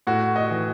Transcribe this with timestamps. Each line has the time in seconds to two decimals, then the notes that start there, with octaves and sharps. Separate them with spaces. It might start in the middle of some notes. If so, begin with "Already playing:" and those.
0.07 A2 F#4
0.36 D#5
0.50 E3